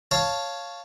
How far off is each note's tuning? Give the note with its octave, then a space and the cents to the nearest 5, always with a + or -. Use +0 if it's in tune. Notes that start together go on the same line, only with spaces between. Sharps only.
C#5 +5 F5 +0 A5 +0